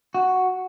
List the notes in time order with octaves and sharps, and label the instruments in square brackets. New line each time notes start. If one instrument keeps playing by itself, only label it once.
[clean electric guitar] F#4